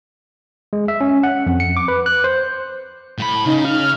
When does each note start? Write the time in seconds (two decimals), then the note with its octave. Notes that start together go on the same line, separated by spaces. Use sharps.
0.73 G#3
0.88 E5
1.01 C#4
1.23 F#5
1.46 F2
1.60 C#7
1.77 D6
1.88 B4
2.06 F#6
2.24 C5
3.18 A2 B5
3.46 C#3 D#4
3.65 F6